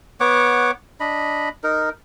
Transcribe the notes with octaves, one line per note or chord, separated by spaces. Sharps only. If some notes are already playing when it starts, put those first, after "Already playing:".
B3 C#5 F#5 D6
D4 D#5 B5
D#4 A#4